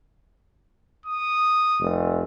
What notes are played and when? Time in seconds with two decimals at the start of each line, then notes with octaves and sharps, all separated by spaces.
1.06 D#6
1.80 F1